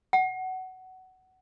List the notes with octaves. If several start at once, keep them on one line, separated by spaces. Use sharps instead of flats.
F#5